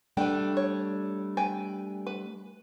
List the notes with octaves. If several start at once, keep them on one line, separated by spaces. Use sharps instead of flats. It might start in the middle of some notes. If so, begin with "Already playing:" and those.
G3 A3 D4 B4 G5
C#5
B4 G5 G#5
B4